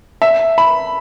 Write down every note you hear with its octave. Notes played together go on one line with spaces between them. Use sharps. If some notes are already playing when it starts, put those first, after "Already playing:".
E5
B5